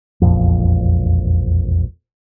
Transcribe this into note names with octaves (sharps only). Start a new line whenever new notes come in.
E1 A#1 F2